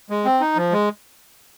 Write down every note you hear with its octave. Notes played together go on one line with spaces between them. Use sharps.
G#3
C4
D#4
F3
G#3